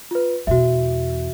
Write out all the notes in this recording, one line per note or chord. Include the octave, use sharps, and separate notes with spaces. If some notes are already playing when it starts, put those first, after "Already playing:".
F4 B4
E2 B2 F#4 E5